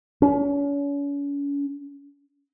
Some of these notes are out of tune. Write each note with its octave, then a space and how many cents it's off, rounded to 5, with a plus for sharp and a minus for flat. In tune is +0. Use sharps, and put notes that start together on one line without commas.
C#4 +40